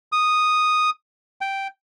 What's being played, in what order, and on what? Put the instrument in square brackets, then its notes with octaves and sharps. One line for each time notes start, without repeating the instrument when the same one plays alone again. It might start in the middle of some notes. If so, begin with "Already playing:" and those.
[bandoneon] D#6
G5